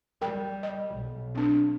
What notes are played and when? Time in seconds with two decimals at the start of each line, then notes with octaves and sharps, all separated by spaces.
0.22 G3 A#4 G5
0.63 D#5
0.95 B1
1.35 C4 D4